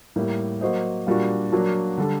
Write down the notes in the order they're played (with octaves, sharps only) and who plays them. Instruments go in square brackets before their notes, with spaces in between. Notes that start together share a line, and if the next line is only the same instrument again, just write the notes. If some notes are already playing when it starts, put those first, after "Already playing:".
[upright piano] A2 G3 A#3
F#3 A#3 F#4 C5 D#5
A#2 G3 A#3 D4 F#4
F#3 A#3 D4 F#4
D3 G3 D4 A4